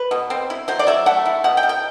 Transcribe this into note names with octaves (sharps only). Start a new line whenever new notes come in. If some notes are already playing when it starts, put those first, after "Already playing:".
Already playing: B4
B2
C4
E4
F#3 C5
D5
F#3 E5
A3 F#5
E4
B2 F#5
G5
B2
G5